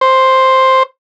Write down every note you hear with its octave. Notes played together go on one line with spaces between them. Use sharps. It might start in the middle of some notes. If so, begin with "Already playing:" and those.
C5